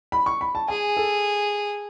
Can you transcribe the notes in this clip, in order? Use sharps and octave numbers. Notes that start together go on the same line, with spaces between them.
B5
C#6
B5
A5
G#4 G#5
A4